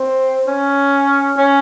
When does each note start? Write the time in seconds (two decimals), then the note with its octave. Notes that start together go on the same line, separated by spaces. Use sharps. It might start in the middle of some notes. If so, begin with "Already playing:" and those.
Already playing: C4
0.47 C#4
1.38 C#4